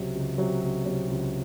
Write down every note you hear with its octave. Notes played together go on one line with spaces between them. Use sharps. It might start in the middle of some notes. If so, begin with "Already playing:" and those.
Already playing: C#2 C3 F#3
C#2
C3 F#3
C#2
C3 F#3
C#2